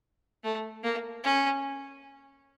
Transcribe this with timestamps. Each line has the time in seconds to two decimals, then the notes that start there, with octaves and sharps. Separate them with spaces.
0.44 A3
0.84 A#3
1.24 C#4